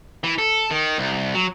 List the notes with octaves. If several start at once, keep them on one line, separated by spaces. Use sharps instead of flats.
E3
A4
D#3
C2
F#3